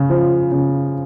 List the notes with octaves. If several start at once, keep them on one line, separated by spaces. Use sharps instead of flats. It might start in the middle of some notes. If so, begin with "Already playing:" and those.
Already playing: C#3
F3
C#3